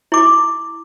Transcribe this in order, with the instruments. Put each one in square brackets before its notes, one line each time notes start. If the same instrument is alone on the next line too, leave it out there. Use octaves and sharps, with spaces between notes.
[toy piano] E4 D6